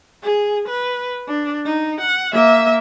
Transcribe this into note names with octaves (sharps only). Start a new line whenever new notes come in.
G#4
B4
D4
D#4
F#5
A#3 E5